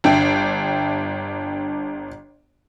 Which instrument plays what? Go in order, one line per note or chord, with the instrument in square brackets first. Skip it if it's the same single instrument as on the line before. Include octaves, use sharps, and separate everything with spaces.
[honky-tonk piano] G1 D4 E5 G5